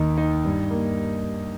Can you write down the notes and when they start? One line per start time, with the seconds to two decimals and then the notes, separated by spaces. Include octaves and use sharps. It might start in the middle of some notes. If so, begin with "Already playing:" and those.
Already playing: D#2 D#3 D#4
0.18 D#4
0.45 G2
0.70 A#3